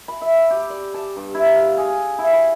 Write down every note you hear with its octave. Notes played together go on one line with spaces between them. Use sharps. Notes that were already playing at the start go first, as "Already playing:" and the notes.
B5
E5
G4
D5
A5
G2
E4
F5
G#4
E4
B5